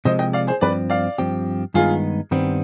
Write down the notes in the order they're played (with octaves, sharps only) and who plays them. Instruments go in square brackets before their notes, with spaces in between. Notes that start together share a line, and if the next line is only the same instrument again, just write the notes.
[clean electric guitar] C3 F3 G#3 [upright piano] C5 D#5
[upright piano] D#5 G5
D5 F5
G#4 C5
[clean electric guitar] G2 F3 C4 [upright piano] B4 D5
[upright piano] D5 F5
[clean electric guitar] G2 F3 C4 G4
[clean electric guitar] G2 D#3 G#3 B3 D#4 [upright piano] F4 G#4
[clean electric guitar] G2 D#3 G3 B3 [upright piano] C4